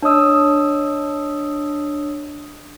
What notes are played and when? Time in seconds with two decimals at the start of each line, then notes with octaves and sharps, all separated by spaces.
0.02 D4 C#5 D#5 D#6 E6